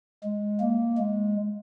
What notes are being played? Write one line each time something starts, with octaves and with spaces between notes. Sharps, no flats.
G#3
A#3
G#3